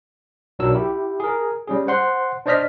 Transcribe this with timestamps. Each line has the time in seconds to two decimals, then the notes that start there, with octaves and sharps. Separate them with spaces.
0.59 B1 F#3 D4 F#4 A#4 E6
0.75 E4 G4
1.20 G#4 A#4
1.67 G3 C#4 G#4
1.87 C5 F#5 C6
2.46 D4 C5 D5 D#5 F6 B6